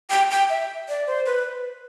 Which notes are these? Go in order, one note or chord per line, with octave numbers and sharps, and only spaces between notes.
G5
G5
E5
D5
C5
B4